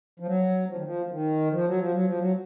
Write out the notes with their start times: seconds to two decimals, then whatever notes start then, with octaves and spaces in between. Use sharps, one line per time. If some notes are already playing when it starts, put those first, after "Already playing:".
0.20 F3
0.26 F#3
0.69 F3
0.76 D#3
0.84 F3
1.06 F3
1.11 D#3
1.52 F3
1.66 F#3
1.79 F3
1.92 F#3
2.06 F3
2.18 F#3